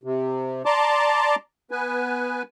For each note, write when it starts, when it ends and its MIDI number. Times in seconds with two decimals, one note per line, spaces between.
0.04 0.62 48
0.65 1.35 74
0.65 1.35 81
0.65 1.35 82
0.65 1.35 84
0.65 1.35 86
1.71 2.43 59
1.71 2.43 71
1.71 2.43 80